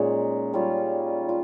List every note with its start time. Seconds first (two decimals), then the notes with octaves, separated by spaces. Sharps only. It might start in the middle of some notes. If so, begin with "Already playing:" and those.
Already playing: A#2 G#3 C#4 D#4
0.53 G3 C#4 F4
1.29 F4